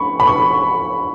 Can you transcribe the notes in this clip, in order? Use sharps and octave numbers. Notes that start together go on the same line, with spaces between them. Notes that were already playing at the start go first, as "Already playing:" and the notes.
Already playing: B5 C#6
B5
C#6